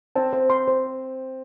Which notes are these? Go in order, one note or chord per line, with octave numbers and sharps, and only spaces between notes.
C4 A5
C5
C6
C5